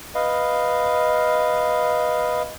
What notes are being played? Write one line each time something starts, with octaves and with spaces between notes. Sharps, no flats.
B4 D#5 F5